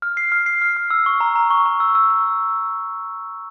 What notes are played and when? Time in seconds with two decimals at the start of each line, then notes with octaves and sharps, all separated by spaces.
0.02 F6
0.17 C7
0.32 F6
0.46 C7
0.62 F6
0.77 F6
0.90 E6
1.06 C#6
1.21 A#5
1.36 A#5
1.51 C#6
1.66 A#5
1.80 E6
1.95 E6
2.10 E6